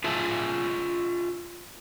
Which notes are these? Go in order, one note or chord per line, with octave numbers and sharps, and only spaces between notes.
F4 G#4 E5 A5